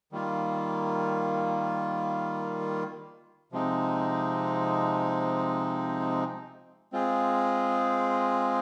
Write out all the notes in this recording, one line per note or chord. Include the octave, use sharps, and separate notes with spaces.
D#3 G3 A#3 F4
C3 F3 G#3 C4 D#4
G#3 C4 F4 G#4